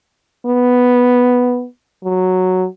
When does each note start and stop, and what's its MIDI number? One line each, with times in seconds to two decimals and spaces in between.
0.46 1.65 59
2.04 2.66 54